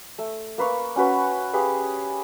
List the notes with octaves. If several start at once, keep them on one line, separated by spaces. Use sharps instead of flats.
A3
A#3 B4 F5 C#6
C#4 F#4 B4 C#5
G4 G#4 B4 F5